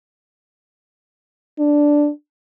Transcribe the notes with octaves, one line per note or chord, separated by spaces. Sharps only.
D4